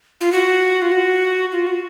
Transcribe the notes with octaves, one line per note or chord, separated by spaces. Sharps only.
F4
F#4
F4
F#4
F4
F#4